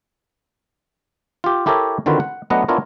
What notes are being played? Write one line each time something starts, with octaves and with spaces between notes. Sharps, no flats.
F4 G4
E4 G4 A4 A#4 C#5 E5
D3 D#3 C4 F4 F#4 B4
F#5
F#3 A3 B3 D4 D#5 F#5
B3 D4 E4 F4 A#4 C#5